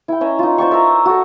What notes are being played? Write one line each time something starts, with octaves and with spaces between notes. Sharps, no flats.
E4 G5
C#4 D#5 E5 A#5
D#4 F4
C5 D5 G5 C#6
A#4 E5 A5 A#5
F#4 A4